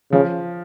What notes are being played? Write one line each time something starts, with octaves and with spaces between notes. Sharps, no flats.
C#3 F3